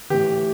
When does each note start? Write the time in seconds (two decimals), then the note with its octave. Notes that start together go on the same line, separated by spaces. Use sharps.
0.10 A2 E3 G4